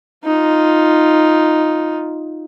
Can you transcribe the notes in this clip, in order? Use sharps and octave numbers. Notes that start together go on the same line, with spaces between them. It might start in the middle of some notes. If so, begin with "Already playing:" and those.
D#4 F4